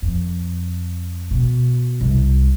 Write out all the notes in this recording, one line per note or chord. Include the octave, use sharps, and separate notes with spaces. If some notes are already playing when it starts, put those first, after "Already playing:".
F2
B2
C2